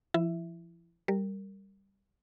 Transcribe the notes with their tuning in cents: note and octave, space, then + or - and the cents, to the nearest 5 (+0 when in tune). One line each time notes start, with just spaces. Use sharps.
F3 -40 E4 +10 E5 +0
G3 +0 A#4 -15